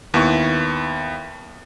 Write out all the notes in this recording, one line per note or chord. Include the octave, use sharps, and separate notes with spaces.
D#2 B3 E4 C#6